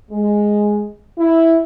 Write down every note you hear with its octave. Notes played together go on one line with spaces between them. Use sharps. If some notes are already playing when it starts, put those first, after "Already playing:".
G#3
E4